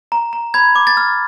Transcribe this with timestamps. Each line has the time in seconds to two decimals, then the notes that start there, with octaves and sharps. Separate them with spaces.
0.12 A#5
0.33 A#5
0.54 B5 G#6
0.76 D6
0.87 A6
0.97 F6